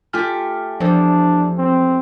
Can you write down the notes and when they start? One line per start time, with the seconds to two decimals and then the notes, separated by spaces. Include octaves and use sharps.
0.13 A3 F4 G4 G#5 F6
0.80 E2 F3 D4 A4 C5
1.58 C4